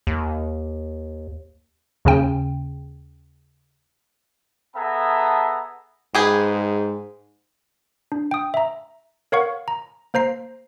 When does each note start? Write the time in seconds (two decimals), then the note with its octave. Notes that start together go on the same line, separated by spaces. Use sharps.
0.07 D#2
2.05 D#2 C#3 C#4 G5
4.75 B3 G#4 A4 E5 A5 A#5
6.15 G#2 G4 G#4 B4
8.12 D4
8.31 G5 D#6
8.54 E5 A#5
9.32 A#4 C#5 F5 F#5 C#6
9.68 A#5
10.14 A#3 C5 A#5 C7